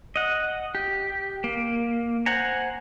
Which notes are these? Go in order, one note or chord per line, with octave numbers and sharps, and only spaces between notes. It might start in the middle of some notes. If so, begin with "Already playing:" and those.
D#5 F#5
G4
A#3
C5 F#5 G#5 A#5